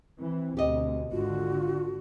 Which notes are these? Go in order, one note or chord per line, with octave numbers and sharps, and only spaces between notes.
E3 C4
D2 B2 G4 D#5
G#1 D3 F4 F#4